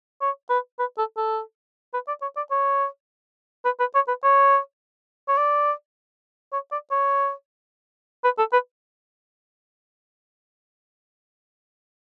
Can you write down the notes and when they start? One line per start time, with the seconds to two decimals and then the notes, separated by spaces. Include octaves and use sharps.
0.21 C#5
0.50 B4
0.79 B4
0.98 A4
1.17 A4
1.94 B4
2.08 D5
2.22 C#5
2.37 D5
2.51 C#5
3.65 B4
3.80 B4
3.95 C#5
4.08 B4
4.23 C#5
5.28 C#5
5.37 D5
6.53 C#5
6.71 D5
6.91 C#5
8.24 B4
8.38 A4
8.53 B4